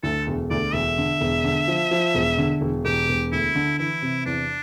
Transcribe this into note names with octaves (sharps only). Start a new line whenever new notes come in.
D2 A4
E1
D2 D5
E1 E5
D3
E1
D3
F3
F3
E1
D3
E1
E1 G4
E1
D2 E4
D3
E3 E4
C3
E2 D4